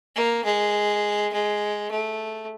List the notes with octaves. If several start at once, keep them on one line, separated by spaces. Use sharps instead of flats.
A#3
G#3
G#3
A3